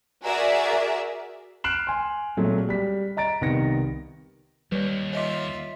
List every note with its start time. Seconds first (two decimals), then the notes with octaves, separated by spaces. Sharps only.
0.24 F#4 G#4 A#4 D5 E5
1.64 F6 F#6 C7 D7 E7 F#7
1.87 G#5 C6
2.37 A#2 F#3 G#3 A3 C4
2.69 G3 B6
3.17 D#5 A#5 A6 D7
3.41 C2 D#3 B3 A#6 C#7
4.72 D#2 G3 B4 C#5
5.13 F4 C#5 D#5 E5 D6